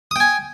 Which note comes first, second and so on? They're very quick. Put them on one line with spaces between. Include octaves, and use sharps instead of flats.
D#6 G5 G#5